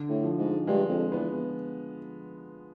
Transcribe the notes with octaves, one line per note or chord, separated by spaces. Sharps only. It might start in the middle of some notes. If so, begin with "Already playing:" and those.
Already playing: D3
A2
F3
G#2
G2 G#3
F2
E2 B3